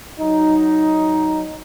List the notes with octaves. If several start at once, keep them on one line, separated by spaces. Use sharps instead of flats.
F#3 D#4